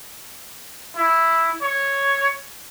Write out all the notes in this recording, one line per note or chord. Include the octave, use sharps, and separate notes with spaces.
E4
C#5